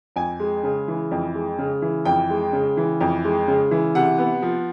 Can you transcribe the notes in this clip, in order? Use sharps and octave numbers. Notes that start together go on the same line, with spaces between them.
F2 G#5
G#3
C#3
E3
F2
G#3
C#3
E3
F2 G5
G#3
C#3
E3
F2
G#3
C#3
E3
C3 F#5
B3
F3